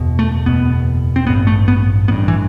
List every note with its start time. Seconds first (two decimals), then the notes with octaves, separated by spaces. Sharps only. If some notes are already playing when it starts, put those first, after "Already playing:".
Already playing: F#1 E2 B2
0.19 A3
0.46 F#1 E2 B2 B3
1.16 C4
1.27 A1 G2 B3
1.47 A3
1.68 B3
2.08 A1 B3
2.12 G2
2.28 E3